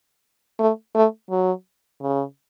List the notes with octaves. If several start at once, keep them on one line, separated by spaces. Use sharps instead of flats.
A3
A3
F#3
C#3